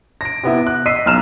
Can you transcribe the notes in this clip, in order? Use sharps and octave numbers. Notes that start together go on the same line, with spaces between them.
A#6 D7
C3 B3 E4
F#6
D#5 E6 B6 C7 D#7
B1 A#5 F6 E7